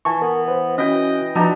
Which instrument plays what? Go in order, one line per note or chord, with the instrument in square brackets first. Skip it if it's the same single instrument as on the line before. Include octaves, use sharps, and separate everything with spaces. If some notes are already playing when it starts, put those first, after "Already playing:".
[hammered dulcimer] E3 [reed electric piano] G#5 A5 C#6
[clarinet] B3 [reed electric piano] A#4
[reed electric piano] B4 C5
[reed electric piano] C#4 F#4 [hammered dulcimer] B4 G5 [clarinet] D#5
[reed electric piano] F3 F#4 [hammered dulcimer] B3 D4 D#4 [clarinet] A#5